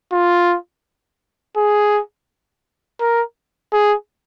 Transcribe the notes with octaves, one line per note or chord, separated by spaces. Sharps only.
F4
G#4
A#4
G#4